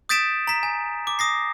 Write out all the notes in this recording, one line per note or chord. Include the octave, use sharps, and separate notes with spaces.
D#6 G6 A6 B6 D7 E7
A#5 B6
G#5
D6
D#6 A#6 C7